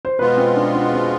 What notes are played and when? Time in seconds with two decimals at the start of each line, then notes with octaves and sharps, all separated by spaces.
0.05 C5
0.19 B2 G#3 B3 F4 B4
0.37 C4
0.56 D4
0.75 D4
0.93 C4